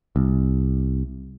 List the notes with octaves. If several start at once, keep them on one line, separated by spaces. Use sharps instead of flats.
C2